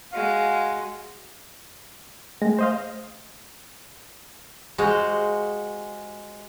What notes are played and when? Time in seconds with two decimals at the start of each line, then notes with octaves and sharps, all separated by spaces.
0.13 G#3 F#4 F5
2.42 G#3 A3
2.59 C5 D#5 F5
4.78 G#3 F#4 G#4 C5 F5